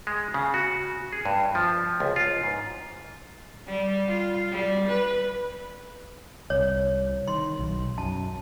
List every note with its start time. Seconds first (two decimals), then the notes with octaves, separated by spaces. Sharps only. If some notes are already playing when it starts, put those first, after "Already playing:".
0.07 G#3
0.34 C#3
0.54 F#4
1.12 G#4
1.25 G2
1.55 F3
2.00 C#2
2.16 F4
2.43 G#2
3.67 G3
4.08 F4
4.51 G3
4.88 B4
6.50 C2 C#5
7.28 D#3 C6
7.59 B1
7.98 F#2 A5